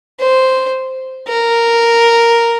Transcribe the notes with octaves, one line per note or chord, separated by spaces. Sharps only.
C5
A#4